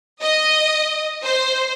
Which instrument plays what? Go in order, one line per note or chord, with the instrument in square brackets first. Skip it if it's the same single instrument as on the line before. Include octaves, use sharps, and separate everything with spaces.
[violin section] D#5
C5